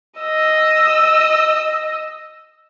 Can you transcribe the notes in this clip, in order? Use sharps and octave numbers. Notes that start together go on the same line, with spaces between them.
D#5 E6